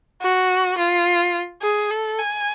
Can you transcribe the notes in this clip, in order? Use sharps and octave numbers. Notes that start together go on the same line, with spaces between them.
F#4
F4
G#4
A4
G#5